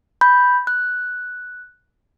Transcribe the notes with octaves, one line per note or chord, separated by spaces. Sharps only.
B5 G6
F#6